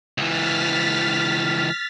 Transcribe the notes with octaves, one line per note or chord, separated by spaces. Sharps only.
C#2 E3 F6 A6 B6